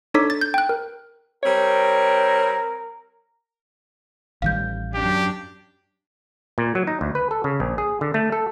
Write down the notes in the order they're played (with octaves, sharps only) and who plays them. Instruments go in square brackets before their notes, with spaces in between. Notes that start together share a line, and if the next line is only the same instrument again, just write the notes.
[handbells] D4 D#4 A4 C#5 D6 B6
A6
G6
G5 F#6
A#4
[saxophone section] G3 C4 C#5 [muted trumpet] A#4
[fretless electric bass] A1 D#3 G3 [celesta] F5 G6
[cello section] F#2 D4 [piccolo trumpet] G4
[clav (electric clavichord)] A#2
F#3
D#4
D2
B4
A4
C#3
A#1
G#4
D3
A3
A4